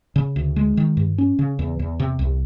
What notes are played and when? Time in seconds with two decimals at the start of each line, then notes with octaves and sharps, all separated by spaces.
0.16 C#3
0.36 D2
0.56 G#3
0.77 D#3
0.97 G2
1.18 C#4
1.39 C#3
1.59 E2
1.79 E2
2.00 C3
2.19 C2